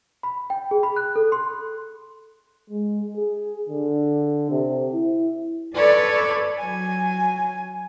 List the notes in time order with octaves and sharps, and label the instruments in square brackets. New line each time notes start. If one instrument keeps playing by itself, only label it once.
[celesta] B5
G5
G#4
B5
F#6
A4
C6
[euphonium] G#3
G#4
D3
C3
E4
[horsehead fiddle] A4 C#5 [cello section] B4 D5
[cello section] F#3 [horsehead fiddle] G#5